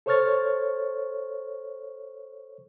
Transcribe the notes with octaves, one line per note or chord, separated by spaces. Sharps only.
A4 C5 C#5 C#6 F6 A6